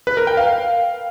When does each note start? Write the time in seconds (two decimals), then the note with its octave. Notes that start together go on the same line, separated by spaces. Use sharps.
0.07 B4
0.17 A#4
0.27 G5
0.37 F5